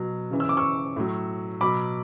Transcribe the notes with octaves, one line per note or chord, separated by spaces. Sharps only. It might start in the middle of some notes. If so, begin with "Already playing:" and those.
Already playing: B2 F#3
C#3 E3
E6
D6
C#6 E6
A2 F#3
B2 F#3 B5 D6